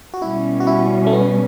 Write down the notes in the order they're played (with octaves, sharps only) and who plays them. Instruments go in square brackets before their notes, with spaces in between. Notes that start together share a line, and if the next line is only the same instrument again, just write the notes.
[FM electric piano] F#4
[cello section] B2 G3 C#4 [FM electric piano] E4
[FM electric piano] F#4
E4
A3
B3